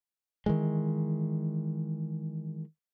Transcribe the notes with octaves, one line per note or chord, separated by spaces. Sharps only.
D#3 E3 G#3